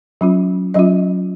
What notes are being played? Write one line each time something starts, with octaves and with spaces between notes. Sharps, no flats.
F#3 C#4 F4
F#3 C#4 F4 D#5